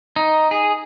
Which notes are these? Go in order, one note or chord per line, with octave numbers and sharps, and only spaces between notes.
D#4
G#4